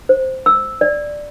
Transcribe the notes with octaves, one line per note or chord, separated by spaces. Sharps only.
C5
E6
D5